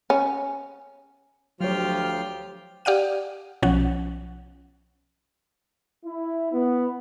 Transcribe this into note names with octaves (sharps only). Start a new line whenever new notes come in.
C#4
D2 F3 F#3 F4 G4 C#5 G5 F6
G4 D5 F5 F#5 D#7
B1 F3 C#4 F#5
E4
B3